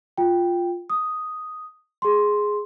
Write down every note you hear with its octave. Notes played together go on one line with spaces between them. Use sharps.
F4 G5
D#6
G#4 C6